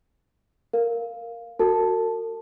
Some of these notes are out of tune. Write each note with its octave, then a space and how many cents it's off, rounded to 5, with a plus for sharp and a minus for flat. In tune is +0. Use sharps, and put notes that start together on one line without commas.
A#4 +0 F5 +0
F#4 +0 A#4 -45 A5 +0